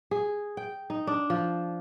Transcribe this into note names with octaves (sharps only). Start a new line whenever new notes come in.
G#4
G5
D#4
D4
F3